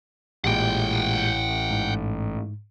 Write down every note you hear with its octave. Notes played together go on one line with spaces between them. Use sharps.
A1 A#2 G#3 G4 F#5 G5
G#2